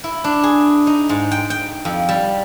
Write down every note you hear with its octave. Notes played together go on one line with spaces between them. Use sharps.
E4
D4
G#4
D#4
G#2
G5
G5
F2
G3